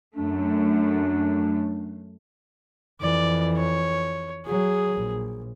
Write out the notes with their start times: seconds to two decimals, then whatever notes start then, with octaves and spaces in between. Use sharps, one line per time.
0.16 F#2 A3 D4
3.01 F2 E3 D5
3.57 C#5
4.46 F#3 G#4
4.92 A#1